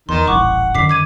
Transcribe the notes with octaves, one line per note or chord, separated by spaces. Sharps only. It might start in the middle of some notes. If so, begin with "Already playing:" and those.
E2 D#3 C6
D#1 A1 F#5 C#6 D6
F#2 D3 D#3 D6 B6 C7
D6 G#6 D#7